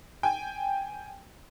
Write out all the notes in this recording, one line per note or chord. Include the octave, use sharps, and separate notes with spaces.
G5 G#5